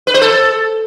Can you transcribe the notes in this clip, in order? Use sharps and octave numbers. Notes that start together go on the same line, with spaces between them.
B4
C5
A4